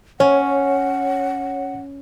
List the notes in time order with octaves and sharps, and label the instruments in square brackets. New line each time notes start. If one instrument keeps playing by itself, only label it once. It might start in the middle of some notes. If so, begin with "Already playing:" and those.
[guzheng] C#4 [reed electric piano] C#5 [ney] F#5